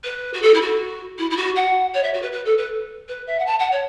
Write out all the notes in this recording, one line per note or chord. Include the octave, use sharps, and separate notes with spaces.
B4
F#4
A4
E4
F#4
E4
E4
F#4
F#5
C#5
E5
F#4
B4
B4
A4
B4
B4
E5
F#5
A5
F#5
C#5